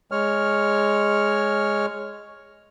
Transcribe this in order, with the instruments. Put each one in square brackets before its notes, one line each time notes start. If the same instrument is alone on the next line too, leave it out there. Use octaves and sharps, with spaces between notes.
[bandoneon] G#3 C#5 F6